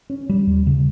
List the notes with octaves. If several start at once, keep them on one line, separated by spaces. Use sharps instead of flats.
C#4
G3
D#2
C#3